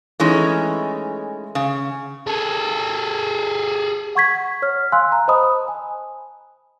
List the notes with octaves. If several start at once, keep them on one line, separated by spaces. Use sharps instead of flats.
E3 G#3 A3 C#4 D#4
C#3
G#4 A4
F#5 C#6 G#6 B6
C#5 F6
F5 G#5 C6 E6 F#6
A#5
C5 D#5 A5 B5 D#6
G#5